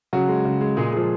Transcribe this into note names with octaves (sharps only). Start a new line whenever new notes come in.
C#3 F#3 F#4
G#3
C#3
G#3
A#2 G#3 G#4
F3 G#3